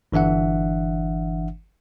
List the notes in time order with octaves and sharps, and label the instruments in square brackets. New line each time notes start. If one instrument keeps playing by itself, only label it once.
[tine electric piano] G1 E3 D4 E5 F#5